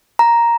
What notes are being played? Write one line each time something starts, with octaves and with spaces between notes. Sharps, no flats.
A#5